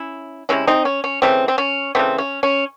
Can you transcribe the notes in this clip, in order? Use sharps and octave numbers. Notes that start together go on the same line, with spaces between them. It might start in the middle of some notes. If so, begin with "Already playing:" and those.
Already playing: C#4 E4
C3 E3 G#3 C#4 E4
C4 D#4
C#4
C#4
C#3 E3 A3 C4
C4
C#4
C#3 E3 A3 C4
C#4
C#4